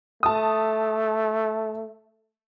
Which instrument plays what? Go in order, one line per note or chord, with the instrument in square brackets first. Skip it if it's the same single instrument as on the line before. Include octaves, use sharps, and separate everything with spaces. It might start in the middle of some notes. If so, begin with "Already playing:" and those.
[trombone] A3 [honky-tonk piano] A5 D#6